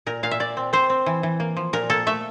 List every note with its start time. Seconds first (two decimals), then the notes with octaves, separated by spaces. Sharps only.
0.06 A#2 A#4
0.23 A#2 F5
0.31 E5
0.40 A#2 D5
0.57 C4
0.73 C4 C5
0.90 C4
1.06 E3
1.23 E3
1.40 A#3
1.57 F3
1.73 A#2 A#4
1.90 A#3 A4
2.07 A3 E5